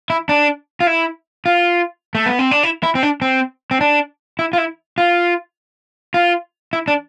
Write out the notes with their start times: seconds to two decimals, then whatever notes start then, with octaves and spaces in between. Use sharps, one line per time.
0.10 E4
0.29 D4
0.80 F4
0.87 E4
1.46 F4
2.15 A3
2.26 B3
2.39 C4
2.51 D4
2.64 E4
2.83 E4
2.95 C4
3.03 D4
3.22 C4
3.71 C4
3.81 D4
4.39 E4
4.53 F4
4.58 E4
4.98 F4
6.14 F4
6.73 E4
6.88 D4